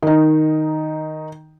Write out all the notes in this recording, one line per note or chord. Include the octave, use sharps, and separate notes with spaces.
D#3 D#4